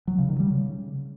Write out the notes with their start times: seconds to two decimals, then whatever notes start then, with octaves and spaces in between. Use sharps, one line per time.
0.08 F#3
0.18 C#3
0.29 D#3
0.40 G3
0.50 C#3